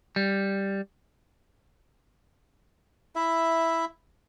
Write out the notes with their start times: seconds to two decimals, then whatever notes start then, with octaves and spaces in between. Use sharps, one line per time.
0.16 G3
3.16 E4 E5